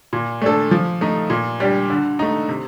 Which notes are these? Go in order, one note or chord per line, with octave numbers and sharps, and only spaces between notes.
A#2
A3 D4 A4
F3
A3 D#4
A#2
G3 D4 G4
D3
A3 D#4
C3